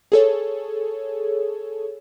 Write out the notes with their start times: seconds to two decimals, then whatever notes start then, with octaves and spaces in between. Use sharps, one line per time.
0.12 G#4 A4 C#5